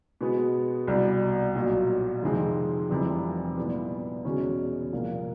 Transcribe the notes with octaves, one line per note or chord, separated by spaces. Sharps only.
B2 G#3 B3
C2 B2 G3
B1 A#2 F#3
F2 C3 D#3 G#3 C4
F1 F2 C3 E3 G3
A#2 G3 B3 E4
E2 B2 G#3 C#4
C2 A#2 F3 A#3